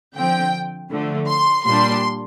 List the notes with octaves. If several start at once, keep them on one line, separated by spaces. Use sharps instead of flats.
D3 F3 C4 G5
D3 F3 A3
C6
A#2 G3 D4 C6